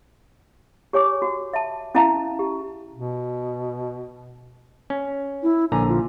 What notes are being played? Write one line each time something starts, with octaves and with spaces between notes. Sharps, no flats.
G4 C#5 G#5 D6
F#4
E5 A5
C#4 E4 E5 F5 A5 A#5
G4
B2
C#4
E4
A#1 D3 G#5 A#5
F4